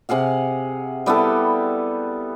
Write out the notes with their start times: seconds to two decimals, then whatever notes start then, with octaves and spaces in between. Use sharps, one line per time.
0.09 C3 G#4 F5 F#5
1.06 G3 B3 E4 A4